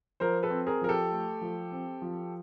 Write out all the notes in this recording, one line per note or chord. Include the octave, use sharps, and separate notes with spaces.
F3 A#4 C5
A4 B4
C4
G#4 A#4
F3 A#4
G4 A4
A3
F3
C4
F3